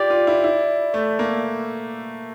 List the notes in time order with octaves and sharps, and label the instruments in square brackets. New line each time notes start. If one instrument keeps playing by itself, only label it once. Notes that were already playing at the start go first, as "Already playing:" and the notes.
Already playing: [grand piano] F4 G4 [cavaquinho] D5
[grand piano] F4
E4
E4
A3
A#3